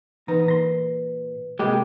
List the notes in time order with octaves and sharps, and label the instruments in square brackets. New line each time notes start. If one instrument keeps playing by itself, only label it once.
[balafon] E3 [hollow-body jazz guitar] B3 D#4 A#5 [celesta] B4
[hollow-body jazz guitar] A#2 A#5 C6
[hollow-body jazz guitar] C3 A#3 [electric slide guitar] G#3 G4